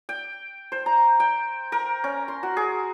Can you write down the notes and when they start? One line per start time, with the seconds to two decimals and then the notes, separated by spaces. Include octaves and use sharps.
0.09 G5
0.72 C5
0.86 A#5
1.20 G5
1.72 A#4
2.04 C#4
2.28 C6
2.43 F#4
2.57 G#4